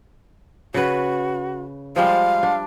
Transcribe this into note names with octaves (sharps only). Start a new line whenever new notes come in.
C#3 F#4 B4
F3 G3 G#3 F5
D4